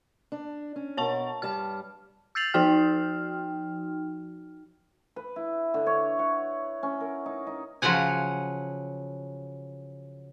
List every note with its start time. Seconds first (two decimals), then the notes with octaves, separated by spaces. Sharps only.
0.32 D4
0.76 C#4
0.97 B2 A#4 C#5 A5 C#6
1.42 G2 G3 A5 F6
2.35 E6 G6 A6 C7 F7 F#7
2.54 F3 D#4 F#4 G5 F6
5.16 B4
5.36 E4
5.74 D3
5.86 C#5
6.19 F#5
6.83 C#4
7.01 A#4
7.26 D#4
7.47 D#4
7.82 C#3 F3 F#3 F#5 G#5